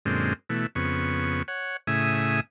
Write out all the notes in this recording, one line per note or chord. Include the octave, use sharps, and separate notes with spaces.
F#2 A#2 D3 G#3 C4
B2 E3 A3
F2 C#3 B3 C#6
C#5 F#5
A2 C#3 E5 G#5 D#6